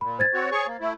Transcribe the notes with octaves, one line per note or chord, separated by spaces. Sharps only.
A#2 B5
C5 G#6 A6
C4 F#4 C#5
G#4 C#5 C#6
A#3
A3 E4